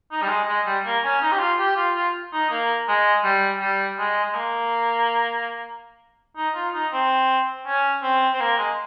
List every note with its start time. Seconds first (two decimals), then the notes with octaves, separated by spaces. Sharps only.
0.12 D#4
0.22 G3
0.29 G#3
0.47 G#3
0.66 G3
0.85 A#3
1.04 C#4
1.21 D#4
1.32 G4
1.40 F4
1.59 G4
1.76 F4
1.96 F4
2.33 D#4
2.50 A#3
2.88 G#3
3.24 G3
3.60 G3
3.98 G#3
4.25 G#3
4.35 A#3
6.37 D#4
6.55 F4
6.74 D#4
6.93 C4
7.67 C#4
8.03 C4
8.34 C4
8.41 A#3
8.58 G#3